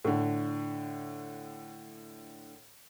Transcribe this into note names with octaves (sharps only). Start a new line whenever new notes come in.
A2 D3